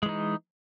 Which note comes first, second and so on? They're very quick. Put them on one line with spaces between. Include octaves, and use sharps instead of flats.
G#3 E3 D#4